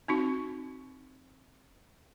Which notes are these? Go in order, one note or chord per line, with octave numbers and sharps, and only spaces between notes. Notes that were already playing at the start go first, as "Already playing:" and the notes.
C4 D#4 F#4